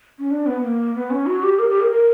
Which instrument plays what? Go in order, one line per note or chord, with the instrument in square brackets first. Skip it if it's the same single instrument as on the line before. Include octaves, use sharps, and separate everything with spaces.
[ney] C#4
D4
B3
A#3
B3
C#4
F#4
G4
A#4
G4
A#4
A#4